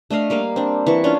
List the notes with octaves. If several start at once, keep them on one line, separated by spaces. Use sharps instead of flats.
A3 D4 D#5 F5
G3 A#3 D#5 F5
C4 D4
E3 C4 C#6
C#4 D4 F4